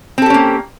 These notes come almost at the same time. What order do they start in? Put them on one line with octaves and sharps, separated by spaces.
C4 A4 G4 C#4 A#3